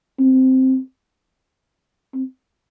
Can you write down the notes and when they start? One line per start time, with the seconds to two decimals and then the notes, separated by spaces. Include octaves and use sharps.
0.19 C4
2.14 C4